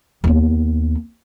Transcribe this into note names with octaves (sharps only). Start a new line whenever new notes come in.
D#2 B3